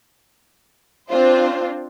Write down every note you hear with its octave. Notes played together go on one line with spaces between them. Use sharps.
C4 D4 F4 C5